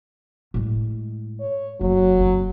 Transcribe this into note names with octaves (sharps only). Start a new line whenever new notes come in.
A2 G#3
C#5
F#1 F#3
F#1 C4